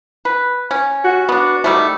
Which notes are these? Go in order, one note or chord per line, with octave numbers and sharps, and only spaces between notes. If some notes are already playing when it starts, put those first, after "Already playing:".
B4
C#4
F#4
B3 D4
D#3 G3 A3